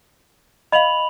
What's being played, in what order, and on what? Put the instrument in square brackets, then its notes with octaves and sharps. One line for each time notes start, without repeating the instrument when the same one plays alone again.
[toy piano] D#5 F5 [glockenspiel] B5 F7 F#7